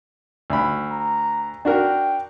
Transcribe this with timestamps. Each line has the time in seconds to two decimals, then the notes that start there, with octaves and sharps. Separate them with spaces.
0.50 D2 B5
0.91 A#5
1.65 D4 F#4 A#4 G5